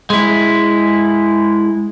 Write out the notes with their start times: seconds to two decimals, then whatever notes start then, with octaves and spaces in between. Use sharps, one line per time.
0.10 G#3 E4